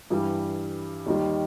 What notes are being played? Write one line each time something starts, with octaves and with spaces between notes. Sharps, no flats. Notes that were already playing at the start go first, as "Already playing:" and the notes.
G2 E3 G3
D#2 D#3 G3